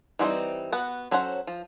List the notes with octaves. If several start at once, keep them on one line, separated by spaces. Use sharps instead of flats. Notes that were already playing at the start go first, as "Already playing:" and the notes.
E3 G3 C4 D4 D#4
B3 F#4 F#5
F#3 C#4 A4 C5 F#5
F3